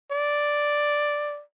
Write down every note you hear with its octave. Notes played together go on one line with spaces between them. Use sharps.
D5